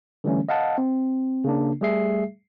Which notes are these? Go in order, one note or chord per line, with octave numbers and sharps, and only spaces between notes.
D3 E3 G3 A3 C#4
D#5 F5 F#5 A5
C4
C#3 A#3 D4
G3 A3 G#4 E5 C7